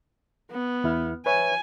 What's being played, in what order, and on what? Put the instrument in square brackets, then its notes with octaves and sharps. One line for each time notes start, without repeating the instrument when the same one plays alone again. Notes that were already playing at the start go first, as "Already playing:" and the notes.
[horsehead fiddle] B3
[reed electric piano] E2 E4 F6
[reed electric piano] B4 C#5 E5 [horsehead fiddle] G#5